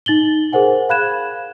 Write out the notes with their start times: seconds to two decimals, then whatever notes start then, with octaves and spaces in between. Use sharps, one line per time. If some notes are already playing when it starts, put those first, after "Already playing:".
0.06 D#4 A6 F#7 G7
0.52 G#4 A#4 C5 F#5 G#5
0.89 F5 B5 F#6 G#6 E7